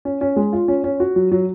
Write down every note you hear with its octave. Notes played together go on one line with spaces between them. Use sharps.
C#4
C#4
G#3
F4
C#4
C#4
F#4
F#3
F#3